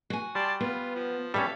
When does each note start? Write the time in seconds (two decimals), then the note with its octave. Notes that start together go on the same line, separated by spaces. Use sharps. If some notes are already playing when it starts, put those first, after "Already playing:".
0.10 F#4 G#5
0.35 G3 D5 A5 C6
0.60 B3 F4
0.95 F3
1.34 G3 C#4 A4 E5 F5